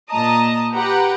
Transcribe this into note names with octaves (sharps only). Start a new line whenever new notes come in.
A#2 D#5 A5 A#5 D#6
G4 B4 F#5 G5 A#5